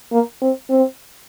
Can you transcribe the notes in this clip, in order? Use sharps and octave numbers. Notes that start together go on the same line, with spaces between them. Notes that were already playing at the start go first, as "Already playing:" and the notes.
A#3
C4
C4